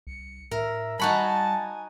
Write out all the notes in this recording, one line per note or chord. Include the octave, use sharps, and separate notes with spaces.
C2 C#7
A2 A#4 E5
G3 D#4 F#4 G#5 A5 B5